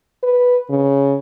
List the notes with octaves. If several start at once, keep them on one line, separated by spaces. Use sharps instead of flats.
B4
C#3